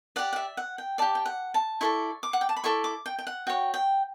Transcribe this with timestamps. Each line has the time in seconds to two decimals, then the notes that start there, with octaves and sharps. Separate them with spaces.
0.16 G4 D5 F#5
0.33 F#5
0.36 E5
0.57 F#5
0.78 G5
0.98 G4 D5 A5
1.15 G5
1.26 F#5
1.54 A5
1.81 E4 A4 D5 C#6
2.23 D6
2.33 F#5
2.41 G5
2.49 A5
2.56 B5
2.64 E4 A4 D5 C#6
2.84 D6
3.06 G5
3.19 G5
3.27 F#5
3.47 F#4 C#5 G5
3.74 G5